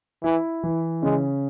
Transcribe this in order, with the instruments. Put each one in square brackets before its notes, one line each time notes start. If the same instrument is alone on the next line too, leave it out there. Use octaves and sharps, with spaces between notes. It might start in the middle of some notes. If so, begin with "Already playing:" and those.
[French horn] E3 [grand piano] E4
[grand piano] E3
[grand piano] C#3 [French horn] G#3